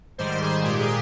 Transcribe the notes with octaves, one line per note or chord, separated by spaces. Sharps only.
G#2 D#3 G3 C5
G#4
A#2 G#3 G4
G#4